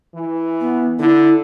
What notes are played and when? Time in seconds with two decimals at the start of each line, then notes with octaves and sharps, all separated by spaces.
0.15 E3
0.61 B3
0.99 D3 E4